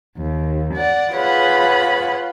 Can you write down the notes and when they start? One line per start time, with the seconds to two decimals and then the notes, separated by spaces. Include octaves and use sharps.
0.17 D#2
0.75 D5 F#5
1.12 F4 G#4 B4 C#5 F#5 B5